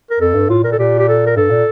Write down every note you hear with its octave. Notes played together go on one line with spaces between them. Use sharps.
A#4
F2 A4
G2
A2 F4
A#2 A#4
A4
A#2 G4
G4
A4
A#4
G2 A4
A#2